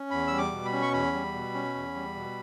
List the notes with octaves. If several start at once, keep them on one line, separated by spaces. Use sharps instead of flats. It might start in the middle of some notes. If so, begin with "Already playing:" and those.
Already playing: C#4
E2 B5
G3 E6
D6
B2
B5
C#4
C#6
E2 B5
G3
B2
C#4
E2
G3
B2